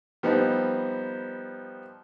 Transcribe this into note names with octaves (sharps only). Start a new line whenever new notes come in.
F3 G3 B3 C4 D#4